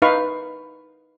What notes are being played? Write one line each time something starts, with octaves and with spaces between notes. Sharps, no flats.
D#4 B4 F5 C#6